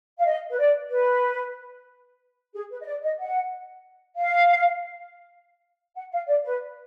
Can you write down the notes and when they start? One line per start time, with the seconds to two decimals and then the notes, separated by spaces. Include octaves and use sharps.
0.18 F5
0.25 D#5
0.51 B4
0.59 D5
0.91 B4
2.54 G#4
2.70 B4
2.81 D#5
2.86 D5
3.03 D#5
3.19 F#5
4.16 F5
5.95 F#5
6.12 F5
6.28 D5
6.44 B4